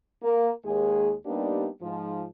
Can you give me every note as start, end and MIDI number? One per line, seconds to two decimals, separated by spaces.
0.22 0.50 58
0.65 1.13 39
0.65 1.13 56
0.65 1.13 68
1.26 1.68 55
1.26 1.68 58
1.26 1.68 59
1.26 1.68 62
1.26 1.68 63
1.26 1.68 67
1.81 2.25 44
1.81 2.25 53